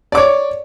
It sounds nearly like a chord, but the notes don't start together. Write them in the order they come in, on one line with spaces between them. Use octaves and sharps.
D5 D6 C#5